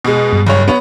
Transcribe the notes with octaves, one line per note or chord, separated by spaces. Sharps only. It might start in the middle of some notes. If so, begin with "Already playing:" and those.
B2 G#3
G2
F#1 C#5
B3 C#5